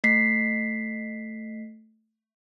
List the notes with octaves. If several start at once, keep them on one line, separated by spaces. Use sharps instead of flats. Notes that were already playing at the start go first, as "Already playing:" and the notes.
A3 B6 C7